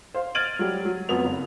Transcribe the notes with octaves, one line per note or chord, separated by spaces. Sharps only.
C5 F5
F6 G#6 A6 D7 D#7 F#7
F#3 G3
F#3
F2 F#3 B3 F7
F#1